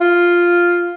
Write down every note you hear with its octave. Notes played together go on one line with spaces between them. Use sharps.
F4